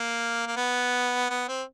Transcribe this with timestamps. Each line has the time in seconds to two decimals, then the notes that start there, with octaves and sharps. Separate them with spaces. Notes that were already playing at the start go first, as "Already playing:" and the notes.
Already playing: A#3
0.47 A#3
0.56 B3
1.30 B3
1.48 C4